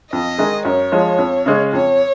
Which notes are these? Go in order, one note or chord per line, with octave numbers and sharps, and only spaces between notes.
F2 D#5
D#3 G#3 D#4 G#4
F#2 C#5
F3 G#3
F2
C#3 G#3 C#4
F2 C#5